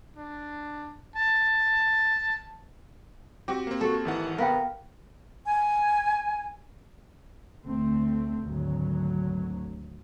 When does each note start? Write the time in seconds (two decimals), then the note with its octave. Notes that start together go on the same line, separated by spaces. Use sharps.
0.17 D4
1.16 A5
3.48 C4 F#4 G4
3.67 A#3 C4
3.81 F#4 A4
4.05 G#1 D#3 E3 F#5
4.38 B3 A#4 E5 F5 G5
5.46 G#5
7.64 D2 A3 C4
8.44 G#1 D2 F#3